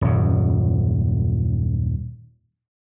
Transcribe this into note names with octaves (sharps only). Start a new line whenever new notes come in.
D#1 F#2